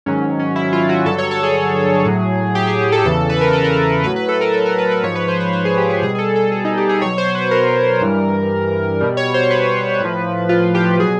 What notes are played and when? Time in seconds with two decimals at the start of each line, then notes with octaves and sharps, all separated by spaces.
0.06 G#2 D#3 F#3 C#4
0.39 C#4
0.56 E4
0.73 F4
0.89 F#4
1.05 G2 D3 F#3 A4
1.18 C#5
1.31 A4
1.43 G#4
2.06 A2 F#3
2.55 G4
2.67 G#4
2.92 A4
3.05 E2 C#3 E3 A4
3.29 B4
3.41 A#4
3.53 A4
3.64 A#4
4.04 A2 F#3 B4
4.16 B4
4.29 A4
4.41 A#4
4.54 A4
4.66 A#4
4.79 B4
4.91 B4
5.03 G#2 F3 C#5
5.15 B4
5.28 C5
5.40 C#5
5.53 C5
5.65 G#4
5.77 G4
5.90 G#4
6.02 B2 G3 G#4
6.15 G#4
6.18 A4
6.36 A4
6.52 G#4
6.65 D#4
6.77 G4
6.89 G#4
7.02 B2 F#3 C#5
7.18 C5
7.35 B4
7.51 A#4
8.01 G2 E3 G3
9.01 B2 G3
9.17 C#5
9.34 C5
9.50 B4
10.00 A2 F3
10.49 F4
10.75 G4
10.99 B2 F#3 G#4